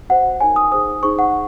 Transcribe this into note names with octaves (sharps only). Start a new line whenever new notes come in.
F#4 C5 F#5
D#4 A#4 C#5 G#5
D#6
D#4 G#4 C5 D#6
D#4 G#4 C5 C#6
F#5